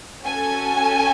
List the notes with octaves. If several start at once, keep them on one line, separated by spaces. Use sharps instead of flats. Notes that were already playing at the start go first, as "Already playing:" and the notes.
C#4 F#4 A4 G#5